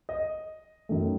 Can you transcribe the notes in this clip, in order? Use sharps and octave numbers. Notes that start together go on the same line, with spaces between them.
D#5
F#2 D#3 A3